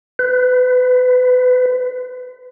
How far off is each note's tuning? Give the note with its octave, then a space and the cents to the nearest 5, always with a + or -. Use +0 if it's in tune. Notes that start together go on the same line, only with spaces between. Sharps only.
B4 +30